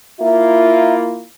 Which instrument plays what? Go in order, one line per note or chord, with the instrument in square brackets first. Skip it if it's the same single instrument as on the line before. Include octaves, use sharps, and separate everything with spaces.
[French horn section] A#3 E4 F4 [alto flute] E5